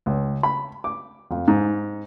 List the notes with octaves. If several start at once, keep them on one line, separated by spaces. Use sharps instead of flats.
C#2
B5
D6
F2
G#2